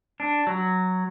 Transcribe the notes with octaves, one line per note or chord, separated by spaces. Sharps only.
D4
F#3